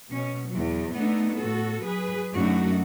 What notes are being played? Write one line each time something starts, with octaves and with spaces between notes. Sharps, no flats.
B2 C#4
E2 F#3
A3 B3 D4 D#4
A2 F#4 A4
F#3 G#4 B4
F#2 A3 D4 D#4 F#4